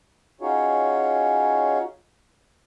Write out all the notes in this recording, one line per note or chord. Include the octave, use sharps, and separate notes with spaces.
C#4 D#4 F4 F#4 G#4 C#5